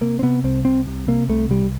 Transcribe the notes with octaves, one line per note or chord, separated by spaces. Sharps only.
C3 A#3
C4
C3 B3
C2 C4
C2 C4
C3
C3 A#3
C2 A3
C2 G3